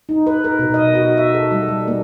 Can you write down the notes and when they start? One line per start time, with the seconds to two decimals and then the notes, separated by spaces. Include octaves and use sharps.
0.09 D#4
0.27 B4
0.44 A#4
0.59 B2
0.74 D#5
0.95 F#4
1.17 E5
1.34 A4
1.52 G3
1.68 G3
1.88 A#3